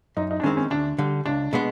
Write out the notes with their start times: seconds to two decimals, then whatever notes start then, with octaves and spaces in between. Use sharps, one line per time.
0.17 F#2 D#4
0.31 D#4
0.40 D4
0.43 D#3 G#3 C4 C#4
0.57 C#4
0.70 D2 D4
0.98 D3 G3
1.26 C#2 D4
1.53 B2 G#3 B3